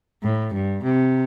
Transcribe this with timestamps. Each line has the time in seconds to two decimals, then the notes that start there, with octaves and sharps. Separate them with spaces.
0.23 A2
0.54 G2
0.84 C3